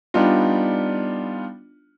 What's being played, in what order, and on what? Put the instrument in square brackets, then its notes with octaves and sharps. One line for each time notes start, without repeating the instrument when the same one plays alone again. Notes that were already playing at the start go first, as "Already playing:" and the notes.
[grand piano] G3 B3 D4 D#4 F4